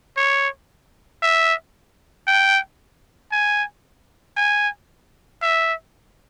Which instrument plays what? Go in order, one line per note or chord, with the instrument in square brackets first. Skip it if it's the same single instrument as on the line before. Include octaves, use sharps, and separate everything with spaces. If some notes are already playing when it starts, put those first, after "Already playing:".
[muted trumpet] C#5
E5
G5
G#5
G#5
E5